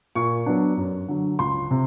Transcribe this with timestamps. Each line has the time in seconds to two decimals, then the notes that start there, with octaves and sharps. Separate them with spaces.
0.15 A#2 C#6
0.46 F#3 B3 D4
0.78 F#2
1.08 D3 F#3
1.39 C#2 C6
1.71 C3